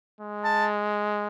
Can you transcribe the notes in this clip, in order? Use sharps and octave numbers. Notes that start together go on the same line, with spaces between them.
G#3
A5